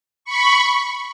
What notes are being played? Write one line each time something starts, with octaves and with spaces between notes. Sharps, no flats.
B5 C#6